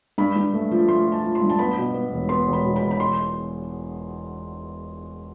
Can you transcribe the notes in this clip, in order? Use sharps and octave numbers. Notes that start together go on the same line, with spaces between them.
G2 B5
G2
A3
F3
A3 C6
F3
A5
F3
C6
G2
A5
B3 B5
B2
B3
E1
B3 C6
E1
B5
B2
B5
E2
B5
C6